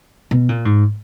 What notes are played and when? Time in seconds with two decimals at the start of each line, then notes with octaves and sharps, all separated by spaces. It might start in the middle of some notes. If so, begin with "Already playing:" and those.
0.31 B2
0.49 A#2
0.65 G#2